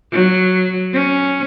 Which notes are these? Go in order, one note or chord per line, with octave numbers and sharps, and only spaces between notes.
F#3
C#4